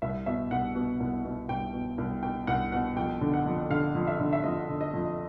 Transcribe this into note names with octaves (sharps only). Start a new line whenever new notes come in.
C2 E5
B2 E5
C2 F#5
B2
C2
B2
C2 G5
B2
C2
B2 G5
C2 F#5
B2 F#5
F2 G5
D3
F#5
F2
D3 F5
F2
E5
D3
E5
F2 D#5
D3
D#5
F2